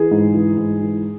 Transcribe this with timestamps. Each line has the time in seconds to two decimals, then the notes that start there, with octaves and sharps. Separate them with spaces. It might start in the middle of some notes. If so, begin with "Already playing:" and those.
Already playing: E3 G#4
0.11 G#2
0.34 E3
0.57 G#2
0.82 E3